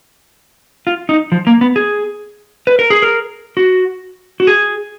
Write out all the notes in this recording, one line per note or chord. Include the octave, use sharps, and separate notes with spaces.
F4
D#4
F3
A#3
B3
G#4
B4
A#4
G#4
A#4
F#4
F#4
G#4